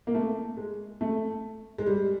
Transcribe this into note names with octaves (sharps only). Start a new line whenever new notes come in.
A#3
A3
G#3
A3
G#3
G3